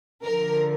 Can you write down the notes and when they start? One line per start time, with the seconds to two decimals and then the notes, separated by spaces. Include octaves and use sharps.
0.24 D3 F3 A#4